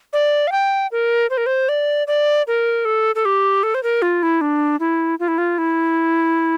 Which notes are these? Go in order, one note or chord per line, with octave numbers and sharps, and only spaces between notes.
D5
F5
G5
A#4
C5
A#4
C5
D5
D5
A#4
A4
A4
G4
A4
C5
A#4
F4
E4
D4
E4
F4
E4
F4
E4